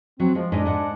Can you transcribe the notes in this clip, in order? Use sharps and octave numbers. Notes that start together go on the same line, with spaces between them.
F#3 C4
F3 G#3
G#2 D4 D#5
G#2 F#5